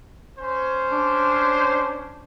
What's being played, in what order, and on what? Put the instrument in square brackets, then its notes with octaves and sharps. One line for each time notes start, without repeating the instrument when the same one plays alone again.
[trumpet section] C#4 C5
[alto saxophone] D4